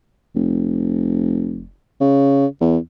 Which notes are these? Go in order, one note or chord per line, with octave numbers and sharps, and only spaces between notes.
F1
C#3
E2